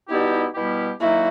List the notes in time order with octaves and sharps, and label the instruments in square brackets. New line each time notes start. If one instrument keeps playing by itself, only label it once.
[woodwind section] B2 G3 B3 E4 G4 [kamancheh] D#4
[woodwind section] B2 G3 B3 E4 G4
[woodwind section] D#3 F#3 A#3 D#4 F#4 [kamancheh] E4